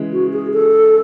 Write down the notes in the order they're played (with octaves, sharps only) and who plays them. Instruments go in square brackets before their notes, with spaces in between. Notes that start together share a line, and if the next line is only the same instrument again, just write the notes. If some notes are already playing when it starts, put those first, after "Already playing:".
Already playing: [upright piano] C#3 E3 G#3
[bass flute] F#4
G#4
A4